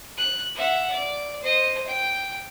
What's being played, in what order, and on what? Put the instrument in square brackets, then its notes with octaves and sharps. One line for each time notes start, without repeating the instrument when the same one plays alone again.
[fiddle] F#6
E5 F#5
D5
C5 D#5
G5